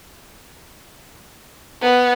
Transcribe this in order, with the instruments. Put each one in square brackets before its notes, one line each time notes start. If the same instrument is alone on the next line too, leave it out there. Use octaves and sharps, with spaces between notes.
[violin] B3